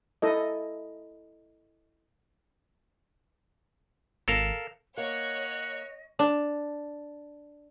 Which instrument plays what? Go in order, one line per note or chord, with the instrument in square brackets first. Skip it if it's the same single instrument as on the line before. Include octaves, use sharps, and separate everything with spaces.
[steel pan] E4 A4 D#5
[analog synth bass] G#1 [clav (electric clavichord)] A4 A#4 F5
[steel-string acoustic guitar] A#3 [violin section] C#5 [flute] D#5 [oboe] F#5
[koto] D4